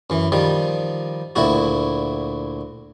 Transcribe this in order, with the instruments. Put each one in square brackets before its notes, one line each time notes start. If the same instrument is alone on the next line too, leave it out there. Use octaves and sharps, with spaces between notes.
[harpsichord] F#2 E3
D#3 F3 G3
D2 A#2 E4 F#4